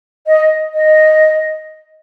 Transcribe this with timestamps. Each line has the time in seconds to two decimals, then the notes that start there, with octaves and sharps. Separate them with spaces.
0.27 D#5
0.74 D#5